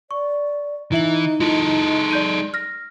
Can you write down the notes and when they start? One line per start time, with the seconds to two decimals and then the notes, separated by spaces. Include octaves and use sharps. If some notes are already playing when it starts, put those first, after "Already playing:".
0.11 D5 C#6
0.92 E3 D#4 E4 E5 F#7
1.40 G#3 E4 F4 A4
2.11 D5 G6 D#7
2.54 F6 A#6